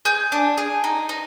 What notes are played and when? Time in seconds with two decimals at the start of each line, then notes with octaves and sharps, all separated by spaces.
0.05 G#4 G6
0.32 D4
0.58 G#4
0.84 D#4
1.09 D#4